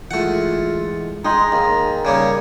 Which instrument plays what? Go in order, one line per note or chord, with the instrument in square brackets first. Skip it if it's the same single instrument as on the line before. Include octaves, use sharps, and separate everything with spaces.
[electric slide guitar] E3 G#3 [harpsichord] A3 F#5 [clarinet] F4
[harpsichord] G#3 [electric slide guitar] D#4 G#4 [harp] D#5 G5 C6 [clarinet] A#5
[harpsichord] D#2
[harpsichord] C#3 G3 A#3 [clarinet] C#5